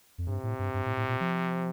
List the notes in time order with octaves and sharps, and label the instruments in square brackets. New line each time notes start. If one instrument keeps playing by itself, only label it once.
[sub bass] F2
[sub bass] G2 [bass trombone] C3
[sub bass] A2
G2
G2
A2
A2
A#2
F3